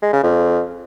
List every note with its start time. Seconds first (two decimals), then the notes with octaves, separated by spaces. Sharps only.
0.02 G#3
0.13 C#3
0.23 F2